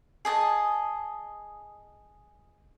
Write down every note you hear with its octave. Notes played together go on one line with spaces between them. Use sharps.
G#4 D#5 A5